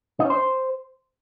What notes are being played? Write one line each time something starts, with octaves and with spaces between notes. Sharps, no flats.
D#4
C#4
C5